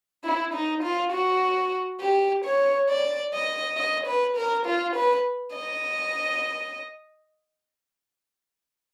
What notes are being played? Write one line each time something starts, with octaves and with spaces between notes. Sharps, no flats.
E4
D#4
F4
F#4
G4
C#5
D5
D#5
D#5
B4
A#4
F4
B4
D#5